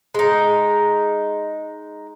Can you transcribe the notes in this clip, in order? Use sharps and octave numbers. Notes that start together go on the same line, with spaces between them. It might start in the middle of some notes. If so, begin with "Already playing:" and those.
G#3 D#4